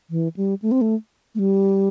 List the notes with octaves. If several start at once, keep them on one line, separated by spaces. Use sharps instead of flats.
E3
G3
A3
C4
A3
A3
G3